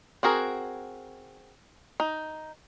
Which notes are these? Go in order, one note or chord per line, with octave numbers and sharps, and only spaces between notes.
C4 F#4 G#4 A#4
D#4